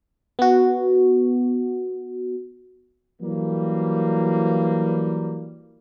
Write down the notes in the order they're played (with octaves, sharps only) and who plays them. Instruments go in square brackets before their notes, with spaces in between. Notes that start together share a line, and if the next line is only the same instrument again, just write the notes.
[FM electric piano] B3 F#4
[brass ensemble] E3 F#3 G3 A#3